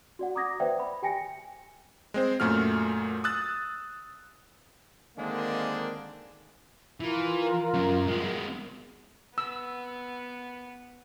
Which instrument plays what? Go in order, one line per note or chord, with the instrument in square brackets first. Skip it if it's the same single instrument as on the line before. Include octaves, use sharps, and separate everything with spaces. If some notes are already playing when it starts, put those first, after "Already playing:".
[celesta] F#4 D5 F#5
A#5 D6 D#6 G#6 A#6
B4 C5 D5 E5 F#5 G5
B5
G4 G5 G#5 A#6 C#7
[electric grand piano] G#3 C4 C5
F#2 A#2 A3 F#4 F6
D#6 E6 F#6 A6
[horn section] D3 D#3 G#3 A#3 C4 D4
[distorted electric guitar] E3 [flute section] F4 A#4
[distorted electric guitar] F#2 C#4
G#3 B3
[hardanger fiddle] B3 [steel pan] E6